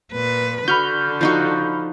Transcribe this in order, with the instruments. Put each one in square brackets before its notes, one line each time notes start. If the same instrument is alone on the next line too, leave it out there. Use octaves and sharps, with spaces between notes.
[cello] A#2 B4
[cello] D3 [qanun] F#4 [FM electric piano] B5 F6 G6
[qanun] F3 D#4 F#4